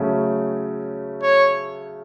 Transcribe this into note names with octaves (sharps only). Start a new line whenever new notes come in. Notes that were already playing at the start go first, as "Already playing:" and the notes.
Already playing: C#3 F#3 A3 C#4
C#5